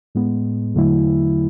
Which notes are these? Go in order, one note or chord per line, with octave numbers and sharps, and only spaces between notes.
A2 G#3 B3
E2 D3 F#3 A3 E4